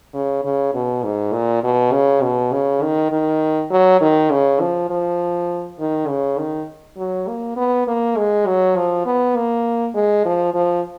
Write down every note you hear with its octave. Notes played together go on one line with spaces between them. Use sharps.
C#3
C#3
B2
G#2
A#2
B2
C#3
B2
C#3
D#3
D#3
F#3
D#3
C#3
F3
F3
D#3
C#3
D#3
F#3
A#3
B3
A#3
G#3
F#3
F3
B3
A#3
G#3
F3
F3